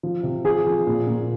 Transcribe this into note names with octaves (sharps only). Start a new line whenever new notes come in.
F3
C3
F3 G#4
F3
A#2
A#2